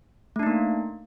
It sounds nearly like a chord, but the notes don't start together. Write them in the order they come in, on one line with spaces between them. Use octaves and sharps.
A3 D4 D#4 A#3